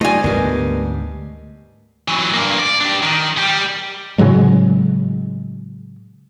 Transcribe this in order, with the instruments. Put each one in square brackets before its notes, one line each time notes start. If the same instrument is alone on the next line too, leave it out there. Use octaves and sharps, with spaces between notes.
[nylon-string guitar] G3 D#4 F4 [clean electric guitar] A3 D5 [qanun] D#5 G#5
[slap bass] D2 G#2 C3 [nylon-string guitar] G3 B3 A#4
[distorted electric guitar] E3 F#3
G2 A#3
D5
D4 G4
D#3
G3 G4
[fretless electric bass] A2 C#3 F#3 G#3